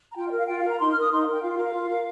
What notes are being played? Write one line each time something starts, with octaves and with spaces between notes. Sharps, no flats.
A#5
F4 G5
D#5
A#4
F5
F4 G5
F5
A#4
A#5
D#4 C6
F6
A#4
D#6
D#4 C6
F5
A#4
G5
F4 F5
F5
A#4
F5
F4
A#4